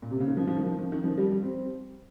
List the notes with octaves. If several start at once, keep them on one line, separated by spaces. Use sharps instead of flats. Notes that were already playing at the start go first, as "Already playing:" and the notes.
A#2
C3
C#3
D#3
F3
F3
D#3
F3
D#3
D#3
F3
G3
G3
C4